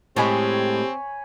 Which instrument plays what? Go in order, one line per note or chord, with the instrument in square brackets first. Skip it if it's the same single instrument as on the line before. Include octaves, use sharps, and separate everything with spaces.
[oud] A2 G#3 [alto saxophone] C4 [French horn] G4 [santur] C#5 G#5 B5